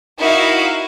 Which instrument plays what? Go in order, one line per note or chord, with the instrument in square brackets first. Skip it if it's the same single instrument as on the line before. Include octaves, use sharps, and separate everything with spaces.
[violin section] D#4 E4 F#4 A#4 D#5 F5